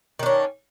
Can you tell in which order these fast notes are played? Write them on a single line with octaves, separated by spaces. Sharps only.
D#3 D4 C#4